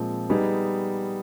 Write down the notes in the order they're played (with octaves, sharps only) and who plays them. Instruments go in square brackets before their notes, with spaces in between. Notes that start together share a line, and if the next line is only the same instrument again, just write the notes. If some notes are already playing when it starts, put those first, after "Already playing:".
Already playing: [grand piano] A#2 F3 G#3 C4
G3 B3 D#4 G#4